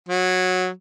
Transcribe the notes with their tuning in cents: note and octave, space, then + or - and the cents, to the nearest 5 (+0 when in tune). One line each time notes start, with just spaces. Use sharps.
F#3 -15